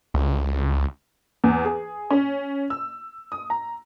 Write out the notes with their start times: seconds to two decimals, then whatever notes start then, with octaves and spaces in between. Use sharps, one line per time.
0.14 C#2
1.44 E2
1.65 G#4
2.10 C#4
2.70 E6
3.32 D#6
3.50 A#5